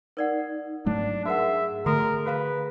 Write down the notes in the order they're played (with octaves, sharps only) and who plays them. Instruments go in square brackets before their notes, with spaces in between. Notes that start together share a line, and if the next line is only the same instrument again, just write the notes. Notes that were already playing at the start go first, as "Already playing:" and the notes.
[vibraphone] D#4 [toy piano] A#4 D5 F#5
[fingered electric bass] G#2 F#3 A3 [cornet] D4
[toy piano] F#4 A#4 F#5 [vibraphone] G#4 [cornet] E5
[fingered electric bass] D3 A3 [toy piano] F#4 A4 A#5 [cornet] A#4
[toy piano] F#4 F5 A#5 [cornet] B4